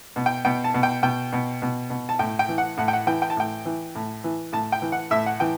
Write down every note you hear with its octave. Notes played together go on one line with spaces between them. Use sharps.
B2
G5
B2 G5
A5
B2
G5
B2 G5
B2
B2
B2
A5
A2 G5
G5
E3
F#5
A2 F#5
G5
F#5
E3 G5
G5
A5
A2 G5
E3
A2
E3
A2 A5
G5
E3
F#5
A2 E5
F#5
E3 G5